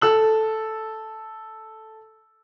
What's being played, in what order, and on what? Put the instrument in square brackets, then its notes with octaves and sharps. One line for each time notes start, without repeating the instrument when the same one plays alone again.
[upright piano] A4 E6 F#7